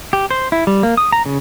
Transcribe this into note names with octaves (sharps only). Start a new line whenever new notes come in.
G4
C5
E4
G3
A#3
D#6
A#5
C#3